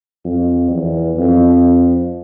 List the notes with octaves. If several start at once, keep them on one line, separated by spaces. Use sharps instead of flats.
F2
E2
F2